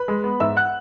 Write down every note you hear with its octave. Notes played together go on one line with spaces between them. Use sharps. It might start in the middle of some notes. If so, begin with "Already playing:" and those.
Already playing: B4 B5
G#3
B3
G#2 E5 E6
F#5 F#6